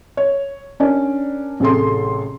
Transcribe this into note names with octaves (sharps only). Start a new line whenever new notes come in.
C#5
C#4 D4 A#4 D5
A1 C3 G#4 A4 C6